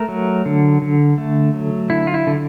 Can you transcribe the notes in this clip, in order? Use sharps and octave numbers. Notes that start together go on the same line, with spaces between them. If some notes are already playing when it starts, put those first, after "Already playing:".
Already playing: A3 A#4
F#3
D3
D3
A3
F#3
D3 E4
F4
E4
D3